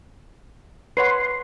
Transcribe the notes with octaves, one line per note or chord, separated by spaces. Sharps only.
B4 C#5 F#5 C6